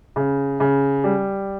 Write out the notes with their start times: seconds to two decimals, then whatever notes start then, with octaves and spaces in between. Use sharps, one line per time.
0.16 C#3
0.60 C#3
1.04 G3